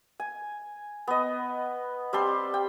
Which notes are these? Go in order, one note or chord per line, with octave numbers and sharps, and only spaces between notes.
G#5
B3 D#5
G3 C4 A5 C6
G5